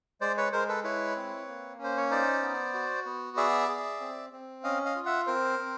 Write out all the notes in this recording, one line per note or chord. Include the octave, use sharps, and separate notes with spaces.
G#3 C5 D5
B4 C#5
G#3 A#4 C5
A4 B4
E4 B4 C#5
C4
A#3
C#4 C5
C#5
D#4 C5 D5
B3
F#4
B3
G#4 D5 E5
G#4
C4
C4
C#4 D#5 F5
D#5 F5
F4
E5 F#5
C4 A#4 C5
C4